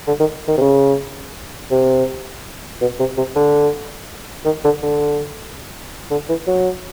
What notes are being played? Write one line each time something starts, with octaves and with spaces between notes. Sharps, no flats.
D3
D#3
D#3
C3
C#3
C3
B2
C3
C3
D3
D#3
D3
D3
D3
E3
F#3